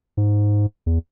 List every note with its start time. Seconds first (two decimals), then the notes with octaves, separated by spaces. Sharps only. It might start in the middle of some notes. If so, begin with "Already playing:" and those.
0.17 G#2
0.86 E2